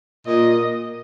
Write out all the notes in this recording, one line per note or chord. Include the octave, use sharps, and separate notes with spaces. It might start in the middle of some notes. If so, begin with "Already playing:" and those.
A#2 D#5